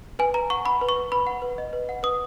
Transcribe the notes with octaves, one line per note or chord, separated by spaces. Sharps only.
B4 G#5
B4 A#5
F#5 C#6
F#5 B5
B4
C#6
B4
B4 B5
F#5
B4
D#5
B4
F#5
B4 D#6